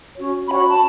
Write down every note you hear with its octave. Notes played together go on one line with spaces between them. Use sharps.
C#4 F#4 C#5
C#4 F#4 C#5 B5
B5
A5